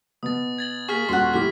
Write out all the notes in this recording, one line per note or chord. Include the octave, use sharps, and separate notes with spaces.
B2 D#6 A6
G#6 A6 F#7
A#3 G#4 C#6 F6 B6
D#1 F#4 F#5 C6
A2 G4 F6 B6